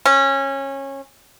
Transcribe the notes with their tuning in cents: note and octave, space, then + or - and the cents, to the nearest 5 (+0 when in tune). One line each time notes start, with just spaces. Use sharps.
C#4 -20